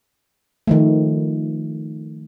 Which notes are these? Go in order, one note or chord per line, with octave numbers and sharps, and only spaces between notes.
D#3 F3 A3